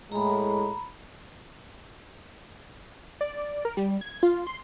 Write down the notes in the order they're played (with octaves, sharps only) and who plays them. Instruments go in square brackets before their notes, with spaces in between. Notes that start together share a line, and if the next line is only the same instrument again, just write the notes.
[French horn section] A2 G#3 [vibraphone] A#5 B5
[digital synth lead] D5
A#4
G3
G#6
F4
C6